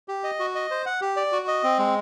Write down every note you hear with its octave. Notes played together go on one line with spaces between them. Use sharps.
G4
D#5
F#4
D#5
C5
F#5
G4
D5
F#4
D#5
C4
G#3